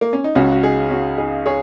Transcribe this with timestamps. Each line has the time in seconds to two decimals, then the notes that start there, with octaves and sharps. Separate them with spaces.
0.01 A#3
0.13 C#4
0.24 D#4
0.35 C#2 C#3 C#4 F#4
0.52 F#4
0.63 D#4 G#4
0.91 C#4 F#4
1.18 D#4 G#4
1.46 G#4 C#5